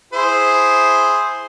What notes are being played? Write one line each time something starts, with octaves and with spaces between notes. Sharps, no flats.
E4 G#4 C5